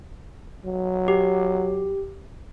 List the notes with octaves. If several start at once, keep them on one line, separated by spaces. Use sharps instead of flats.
F#3
G4